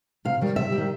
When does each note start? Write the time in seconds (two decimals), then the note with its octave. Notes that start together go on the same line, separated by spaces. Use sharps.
0.25 C3 F5
0.41 D#3 G3
0.56 C3 E5
0.72 G3
0.78 D#3